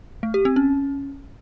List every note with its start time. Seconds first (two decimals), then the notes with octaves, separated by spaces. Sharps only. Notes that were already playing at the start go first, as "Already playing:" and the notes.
0.23 A3
0.34 G4
0.45 C4
0.56 C#4